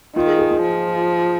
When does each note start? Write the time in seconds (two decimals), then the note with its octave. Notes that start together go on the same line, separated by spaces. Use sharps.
0.16 D#3 F4
0.27 G#4
0.38 G#4
0.51 F4
0.62 F3